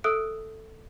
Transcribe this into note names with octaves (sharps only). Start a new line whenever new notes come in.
A4 E5 D#6 E6 F#6 D7